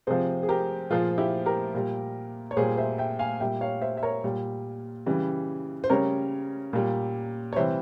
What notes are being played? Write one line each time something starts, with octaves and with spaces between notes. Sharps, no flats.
C3 F3 G#4 C5
G#4
G4 A#4
A#2 F3 F4 G#4
E4 G4
G4 A#4
A#2 G3
C#5
A#2 G3 G#4 C5
C5 E5
E5 G5
F5 G#5
A#2 G3 E5 G5
C#5 F5
C5 E5
E5
A#4 C#5
A#2 G3
C#3 E3 G3
C5
C#3 G3 A#4 C#5
A#2 G3
C#5
C3 E3 G3 C5 E5